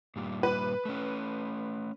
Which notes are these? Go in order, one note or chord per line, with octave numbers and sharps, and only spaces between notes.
G2 A#2 G3
B4
A3 C#4